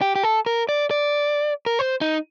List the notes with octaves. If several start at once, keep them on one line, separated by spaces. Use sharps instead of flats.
G4
G4
A4
A#4
D5
D5
A#4
C5
D#4